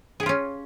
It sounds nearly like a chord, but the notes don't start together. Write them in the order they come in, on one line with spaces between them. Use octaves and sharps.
G#4 G4 F4 C#4